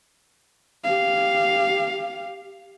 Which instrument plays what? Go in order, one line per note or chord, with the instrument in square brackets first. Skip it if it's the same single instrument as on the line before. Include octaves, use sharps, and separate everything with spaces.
[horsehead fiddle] G4 F5